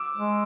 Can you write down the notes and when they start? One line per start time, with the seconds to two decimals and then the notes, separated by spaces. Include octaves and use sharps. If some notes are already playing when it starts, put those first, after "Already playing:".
Already playing: D6 E6
0.17 G#3